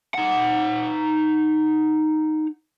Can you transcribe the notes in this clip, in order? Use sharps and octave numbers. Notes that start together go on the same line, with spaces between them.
D#4 F#5